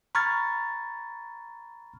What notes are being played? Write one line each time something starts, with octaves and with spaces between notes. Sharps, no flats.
A#5 B5 C#6 F6 G#6 A6